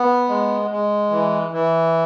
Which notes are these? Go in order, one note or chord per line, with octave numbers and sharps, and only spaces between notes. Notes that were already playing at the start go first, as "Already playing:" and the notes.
Already playing: B3
G#3
G#3
E3
E3